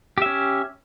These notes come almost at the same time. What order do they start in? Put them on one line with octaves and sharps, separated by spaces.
G4 E5 C#4